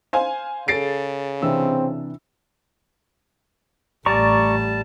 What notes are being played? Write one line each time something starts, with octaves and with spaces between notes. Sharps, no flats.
C5 F5 G#5
C#3 G#4 A4 A6 C7 D7
C3 E3 C4 D4 E6
A1 G3 A3 D5 A5 A#5 C#6